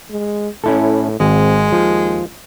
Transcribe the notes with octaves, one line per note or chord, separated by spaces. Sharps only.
G#3
A2 C#4 E4 A4
G#1 G#3 C4
D#2 F3